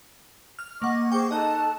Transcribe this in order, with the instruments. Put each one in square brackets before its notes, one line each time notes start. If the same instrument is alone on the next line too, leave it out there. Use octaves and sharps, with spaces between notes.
[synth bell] F6
[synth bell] A#3 F#5 [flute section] D#5 C#6 D6
[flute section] G#4 C5 D6 [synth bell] G5 C#6
[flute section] D#4 A4 A5 [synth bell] D#5 F#6